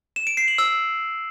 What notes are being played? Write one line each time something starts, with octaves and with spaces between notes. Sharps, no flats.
E7
D7
C7
F#7
E6